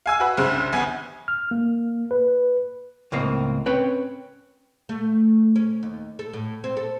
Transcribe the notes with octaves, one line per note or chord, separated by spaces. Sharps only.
F5 G#5 E6
F#4 B4
C2 G2 C#3 C5 F#6
G1 B3 G#5
F6
A#3
B4
C#2 A2 A#3 C4 D#5 F5
C4 C#4 B4 C#5 G5
A3
C#4
D#2
A4
A2
C4
A4